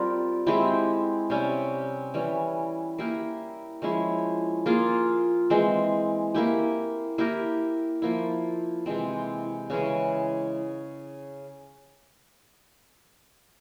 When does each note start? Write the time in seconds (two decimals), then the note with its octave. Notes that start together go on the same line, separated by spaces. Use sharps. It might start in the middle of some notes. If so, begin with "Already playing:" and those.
Already playing: G3 C4 F4 A#4
0.47 G#3 C4 E4 G4
1.30 C3 G3 C#4
2.14 E3 G3 C#4
2.98 A#3 E4 G4 A#4
3.82 F3 G#3 C#4 E4
4.66 A#3 F4 G#4
5.50 E3 G#3 C4
6.35 A#3 E4 G4
7.18 A#3 E4 G4 A#4
8.02 F3 A#3 E4
8.86 C3 E3 G#3 C4
9.70 C#3 E3 G#3 C#4